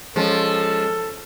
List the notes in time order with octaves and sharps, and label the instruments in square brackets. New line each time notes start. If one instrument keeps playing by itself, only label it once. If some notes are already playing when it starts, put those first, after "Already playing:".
[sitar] F3 [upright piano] G#3 C#4 [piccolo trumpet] A4